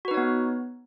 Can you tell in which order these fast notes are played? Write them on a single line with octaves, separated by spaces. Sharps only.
F#4 B4 D#4 C#5 B3